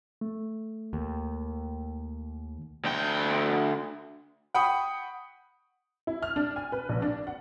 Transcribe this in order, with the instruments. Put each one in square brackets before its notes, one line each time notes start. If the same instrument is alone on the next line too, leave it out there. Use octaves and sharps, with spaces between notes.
[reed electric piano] A3
[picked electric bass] D#2
[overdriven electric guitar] D2 G5
[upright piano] F#5 G5 B5 C#6 D#6
[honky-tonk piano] E4
F6
D4
G#5
B4
A#1
D4
F#5